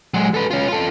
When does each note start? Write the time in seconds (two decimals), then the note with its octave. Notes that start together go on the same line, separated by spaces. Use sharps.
0.14 F#3 G#3
0.34 A4 B4
0.51 C#4 F4
0.68 F4 A4